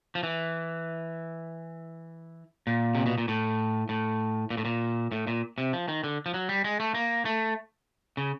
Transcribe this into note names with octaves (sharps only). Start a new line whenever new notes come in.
F3
E3
A#2
C3
B2
A#2
A2
A2
A#2
A2
A#2
A2
A#2
C3
F3
D#3
D3
F3
F#3
G3
G#3
A3
A#3
A3
C#3